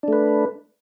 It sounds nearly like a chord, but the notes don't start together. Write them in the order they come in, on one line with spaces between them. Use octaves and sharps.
D4 A3 B4